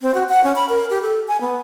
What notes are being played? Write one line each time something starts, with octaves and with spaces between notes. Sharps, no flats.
C4
F#4
F#5
C#4
B5
A#4
G4
A4
G#5
B3